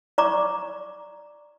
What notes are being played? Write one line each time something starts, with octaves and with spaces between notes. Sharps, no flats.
D5 A#5 C#6 D6